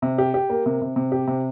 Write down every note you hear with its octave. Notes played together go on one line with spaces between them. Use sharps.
C3
G4
G4
A#3
C3
C3
C3
G4
C3